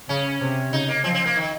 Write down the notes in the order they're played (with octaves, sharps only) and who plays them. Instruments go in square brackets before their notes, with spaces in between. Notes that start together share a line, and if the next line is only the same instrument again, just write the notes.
[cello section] C#3 [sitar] C#4
[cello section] C3
[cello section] C#3 [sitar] D#4
[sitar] A#3
[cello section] F3 [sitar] C4
[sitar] C4
A#3
D#3